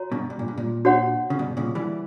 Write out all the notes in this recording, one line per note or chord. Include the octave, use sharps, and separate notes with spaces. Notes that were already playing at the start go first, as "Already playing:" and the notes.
Already playing: F#4 C#5 A#5
G2 B2
G2
A#2
G2
A#2
D4 F#4 C#5 F#5
C#3
G2 B2
A#2 C#3
E3 G3